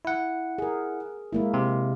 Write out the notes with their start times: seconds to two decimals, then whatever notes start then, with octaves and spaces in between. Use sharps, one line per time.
0.05 E4 F#5
0.58 G#4 A#4
1.33 G#3 A#3 E4
1.54 C3